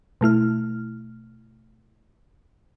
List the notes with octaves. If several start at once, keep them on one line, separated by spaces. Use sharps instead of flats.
B2 A3 E4 F6